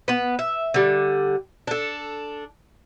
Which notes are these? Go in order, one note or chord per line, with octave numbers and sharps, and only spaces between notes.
B3 B4
E5
D3 G3
D4 A4